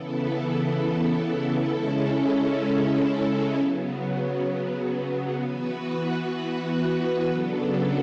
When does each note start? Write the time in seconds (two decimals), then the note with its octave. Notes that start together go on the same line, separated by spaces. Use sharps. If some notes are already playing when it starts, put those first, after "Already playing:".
Already playing: C#3 E3 B3 E4 A4
1.69 C#3 G#3 C#4 E4 A4
3.56 C#3 F#3 B3
5.42 E3 B3 F#4 B4
7.28 C#3 F#3 B3 D4 A4